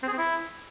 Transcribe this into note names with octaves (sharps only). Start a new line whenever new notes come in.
C4
G#4
C4
E4